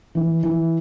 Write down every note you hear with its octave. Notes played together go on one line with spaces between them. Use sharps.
E3
E3